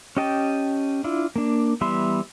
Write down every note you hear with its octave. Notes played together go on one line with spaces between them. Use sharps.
C#4 G4 D#5 G5 A5
D4 E4 F4
A#3 D4
E3 G3 B3 E5 C6